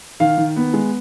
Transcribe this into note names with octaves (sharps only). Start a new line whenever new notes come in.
D#3 F5
D#3
B3
G#3